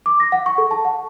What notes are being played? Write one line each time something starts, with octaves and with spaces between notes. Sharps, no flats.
D6
A#6
F#5
C#6
A4
A5
F#5